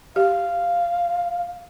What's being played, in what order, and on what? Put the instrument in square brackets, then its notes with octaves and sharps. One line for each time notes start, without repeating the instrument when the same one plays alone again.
[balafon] G4 [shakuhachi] F5